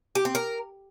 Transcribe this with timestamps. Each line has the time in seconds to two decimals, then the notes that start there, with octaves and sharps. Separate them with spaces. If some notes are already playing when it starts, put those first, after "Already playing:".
0.15 G4
0.25 C4
0.35 A#4